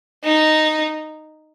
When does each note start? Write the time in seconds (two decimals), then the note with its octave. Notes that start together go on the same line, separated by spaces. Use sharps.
0.24 D#4